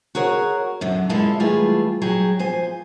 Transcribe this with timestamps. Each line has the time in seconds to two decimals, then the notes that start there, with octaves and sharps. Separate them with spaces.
0.15 F#4 G#4 A#4 C#5 F#5
0.81 F#2 D3
1.09 G#3 A#3 C#4 E4 F4 A4
1.40 E3 G3 A3 F4 G#4 B4
2.02 F#3 G4 G#4
2.39 F3 C5 G#5